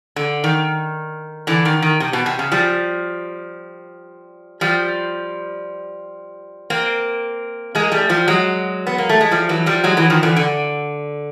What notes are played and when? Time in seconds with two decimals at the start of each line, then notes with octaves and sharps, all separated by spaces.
0.16 D3
0.44 D#3
1.47 D3 E3
1.65 D#3
1.82 D#3
2.00 C3
2.13 B2
2.26 C3
2.39 C#3
2.52 F3 G3
4.61 F3 G3
6.70 A#3 C4
7.75 G#3 A#3
7.92 G3 A3
8.10 F3 G3
8.28 F#3 G#3
8.87 B3
8.98 A#3
9.09 A3
9.21 G#3
9.31 F3 G3
9.49 E3 F#3
9.66 F3 G3
9.84 F#3 G#3
9.97 E3 F#3
10.10 D#3 F3
10.23 D3 E3
10.36 D3